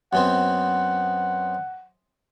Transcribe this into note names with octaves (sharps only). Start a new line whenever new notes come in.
F#2 B3 C4 F#5